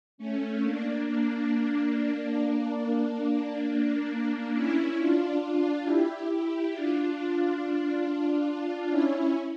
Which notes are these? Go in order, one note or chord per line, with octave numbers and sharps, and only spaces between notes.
A3 C#4
A#3 D4
A#3 D4
C#4 E4
D4 F4
D4 F4
E4 G4
E4 G4
D4 F4
C#4 E4